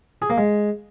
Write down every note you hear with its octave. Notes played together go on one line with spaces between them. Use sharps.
G#4
A#3
G#3